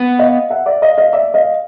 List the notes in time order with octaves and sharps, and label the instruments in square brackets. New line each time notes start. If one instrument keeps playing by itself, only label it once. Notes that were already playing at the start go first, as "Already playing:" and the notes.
Already playing: [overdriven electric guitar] B3
[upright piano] D#5 F5
E5 F#5
D5 E5
D#5 F5
D#5 F5
D5 E5
D#5 F5